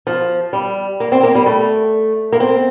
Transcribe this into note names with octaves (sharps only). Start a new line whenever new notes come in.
F3
G3
A#3
C4
A#3
G3
A3
A#3
C4